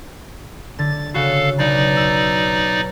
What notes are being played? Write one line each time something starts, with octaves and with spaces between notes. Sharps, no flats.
D3 A6
C#3 F#4 A4 F5
B1 D#4 D5
E6